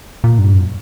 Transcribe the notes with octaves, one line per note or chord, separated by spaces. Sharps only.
A#2
G2
F#2